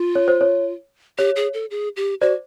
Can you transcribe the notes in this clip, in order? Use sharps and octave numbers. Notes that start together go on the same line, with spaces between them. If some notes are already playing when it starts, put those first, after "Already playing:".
Already playing: F4
C#5
C5
C#5
G4 C#5
G#4
A4
G#4
G4
F#4 C5 D5